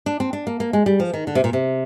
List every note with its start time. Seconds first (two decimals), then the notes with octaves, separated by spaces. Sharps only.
0.06 D4
0.20 C4
0.33 D4
0.47 A#3
0.60 A#3
0.73 G#3
0.86 G3
1.00 F3
1.13 D#3
1.27 D3
1.35 C3
1.44 A#2
1.53 C3